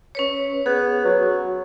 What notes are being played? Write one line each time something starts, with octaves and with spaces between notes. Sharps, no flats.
C#4 B4 C#5
B3 G#4
F#3